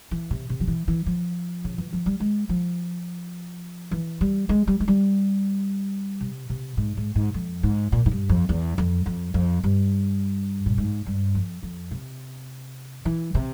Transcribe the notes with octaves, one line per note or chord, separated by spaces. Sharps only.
E3
C3
C3
F3
E3
E3
F3
C#3
E3
F3
G3
G#3
F3
E3
G3
G#3
G3
G#3
G3
C3
C3
G#2
G#2
G#2
F2
G#2
A#2
G#2
G2
F2
E2
F2
F2
F2
G2
A#2
G#2
G2
F2
F2
C3
E3
C3